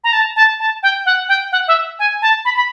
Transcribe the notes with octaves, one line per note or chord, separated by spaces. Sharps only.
A#5
A5
A5
A5
G5
F#5
G5
F#5
E5
G#5
A5
B5
B5